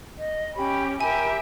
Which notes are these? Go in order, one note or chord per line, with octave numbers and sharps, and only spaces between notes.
D#5
C#4 G4 B5
G4 A#4 E5 G#5 B5